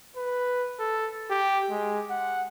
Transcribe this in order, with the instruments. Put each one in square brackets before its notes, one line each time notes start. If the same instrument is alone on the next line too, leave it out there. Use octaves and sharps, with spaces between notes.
[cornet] B4
A4
G4
G#3
F#5